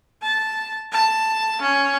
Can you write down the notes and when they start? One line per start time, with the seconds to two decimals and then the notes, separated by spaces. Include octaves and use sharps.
0.22 A5
0.92 A5
1.61 C#4